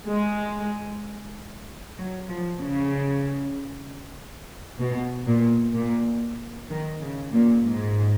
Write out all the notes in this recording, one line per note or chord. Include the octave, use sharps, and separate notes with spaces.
G#3
F#3
F3
C#3
B2
A#2
A#2
D#3
C#3
A#2
G#2